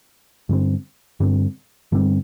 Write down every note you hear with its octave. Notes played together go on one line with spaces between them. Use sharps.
G2 D3 G3 C4
G2 D3 G3 C4
G2 D3 G3 C4